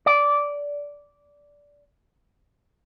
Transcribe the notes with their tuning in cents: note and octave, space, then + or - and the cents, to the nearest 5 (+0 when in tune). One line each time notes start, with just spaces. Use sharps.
D5 -15